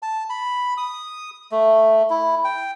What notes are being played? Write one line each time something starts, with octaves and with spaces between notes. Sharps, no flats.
A5
B5
D#6
A3
E4
G5